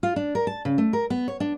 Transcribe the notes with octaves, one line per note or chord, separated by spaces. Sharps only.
F4
D4
A#4
A5
C#3
A3
A#4
B3
C#5
D4